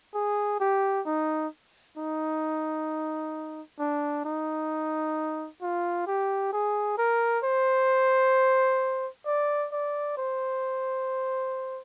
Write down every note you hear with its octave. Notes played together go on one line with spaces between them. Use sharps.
G#4
G4
D#4
D#4
D4
D#4
F4
G4
G#4
A#4
C5
D5
D5
C5